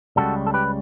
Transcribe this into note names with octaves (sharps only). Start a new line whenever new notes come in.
C#2 C#3 G3 F#4 A4
A4
G4 B4